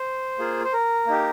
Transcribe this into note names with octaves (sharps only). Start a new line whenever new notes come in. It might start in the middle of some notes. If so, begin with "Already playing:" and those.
Already playing: C5
A#3 F4 G#4
C5
A#4
A#3 D#4 G4